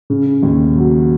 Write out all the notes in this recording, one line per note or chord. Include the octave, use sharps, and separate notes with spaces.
C#3
D#2
F#3